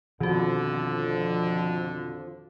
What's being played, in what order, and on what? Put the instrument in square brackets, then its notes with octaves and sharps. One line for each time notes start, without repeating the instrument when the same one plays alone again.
[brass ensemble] F2 D3 [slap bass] B2 [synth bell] D#3 F#4 [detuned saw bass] F3